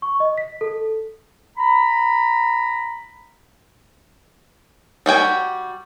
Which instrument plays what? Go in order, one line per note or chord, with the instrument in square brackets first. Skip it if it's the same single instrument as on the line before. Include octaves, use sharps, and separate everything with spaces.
[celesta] C#6
D#5
B6
A4
[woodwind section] A#5 B5
[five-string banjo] G3 F#4 G5 G#5